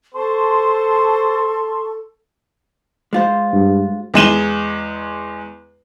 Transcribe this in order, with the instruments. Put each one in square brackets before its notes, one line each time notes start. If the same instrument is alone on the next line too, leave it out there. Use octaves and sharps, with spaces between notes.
[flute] A4 [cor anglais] C5 [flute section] A5 C6 C#6
[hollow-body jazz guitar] G#3 F4 C5
[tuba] G2
[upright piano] E2 G#3 E7 G7